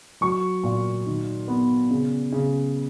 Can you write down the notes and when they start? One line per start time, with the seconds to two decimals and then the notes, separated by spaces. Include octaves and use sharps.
0.21 F#3 C#6
0.64 A#2
1.06 D#3
1.48 B3
1.90 C#3
2.32 C#3